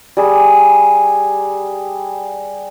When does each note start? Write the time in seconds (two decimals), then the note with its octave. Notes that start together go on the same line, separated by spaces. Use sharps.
0.17 G3 G#4